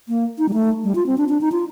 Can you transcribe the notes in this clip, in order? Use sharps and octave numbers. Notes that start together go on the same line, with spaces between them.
A#3
D#4
G3
A3
G3
F4
C4
D4
D4
D#4
F4